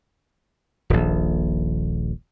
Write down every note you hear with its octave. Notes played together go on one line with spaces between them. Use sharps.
D#1 A#1